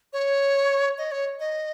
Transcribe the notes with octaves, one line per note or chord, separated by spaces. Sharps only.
C#5
D#5
C#5
D#5